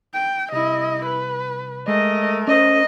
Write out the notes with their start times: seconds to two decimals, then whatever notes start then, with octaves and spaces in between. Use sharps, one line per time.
0.14 G5
0.52 C2 E4 D#5
1.06 B4
1.88 G#3 A3 A#4 D#5
2.47 C#4 C5 D#5